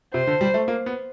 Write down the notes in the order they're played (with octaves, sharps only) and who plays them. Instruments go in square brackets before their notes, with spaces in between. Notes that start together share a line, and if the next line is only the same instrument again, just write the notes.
[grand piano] C3 [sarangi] C5
[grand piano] D3
G3
A3
A#3
B3